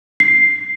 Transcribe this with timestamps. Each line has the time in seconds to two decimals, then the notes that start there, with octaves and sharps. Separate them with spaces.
0.20 C7